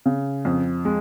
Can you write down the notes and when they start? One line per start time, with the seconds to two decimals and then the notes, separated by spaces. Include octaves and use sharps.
0.06 C#3
0.45 F2
0.85 G#3